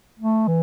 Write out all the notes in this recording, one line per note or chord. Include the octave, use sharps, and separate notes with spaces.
A3
E3